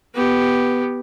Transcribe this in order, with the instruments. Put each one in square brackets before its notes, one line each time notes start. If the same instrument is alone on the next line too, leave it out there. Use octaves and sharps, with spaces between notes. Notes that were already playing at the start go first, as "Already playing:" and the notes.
[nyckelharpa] B3 G4